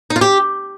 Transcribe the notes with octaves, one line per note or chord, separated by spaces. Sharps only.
D#4
F4
G4